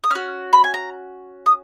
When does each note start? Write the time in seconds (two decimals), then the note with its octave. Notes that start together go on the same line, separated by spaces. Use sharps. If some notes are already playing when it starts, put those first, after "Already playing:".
0.04 D#6
0.10 C#4 F#4 F6
0.53 B5
0.64 G#5
0.74 A#5
1.46 D#6